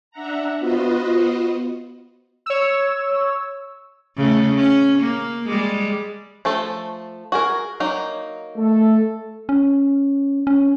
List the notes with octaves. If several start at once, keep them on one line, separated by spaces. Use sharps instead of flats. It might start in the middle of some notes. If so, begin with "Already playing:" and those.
D4 E5 F#5 A#5
B3 F4 F#4 B4 C5 D#5
C#5 E6
C#3 A3
C#4
A#3
G3 G#3
F3 A3 A4
F#4 G#4 A#4
F#3 A#3 D#4
A3 A4
C#4
C#4